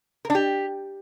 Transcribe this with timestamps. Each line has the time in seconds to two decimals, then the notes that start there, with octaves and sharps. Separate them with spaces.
0.25 A#4
0.30 D4
0.35 G4